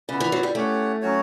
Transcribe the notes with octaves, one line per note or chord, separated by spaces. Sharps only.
C#3 B3 E4 B4 D5
E3
F#3
G3
A3 C#4 G4 C#5 F#5
F#3 C#4 F#4 C#5